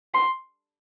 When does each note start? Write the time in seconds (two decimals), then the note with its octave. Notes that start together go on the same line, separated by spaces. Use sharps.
0.14 C6